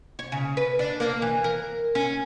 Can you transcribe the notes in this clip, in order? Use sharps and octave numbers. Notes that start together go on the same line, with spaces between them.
C#5
C#3
B4
D4
A#3
E3
A#4
C#4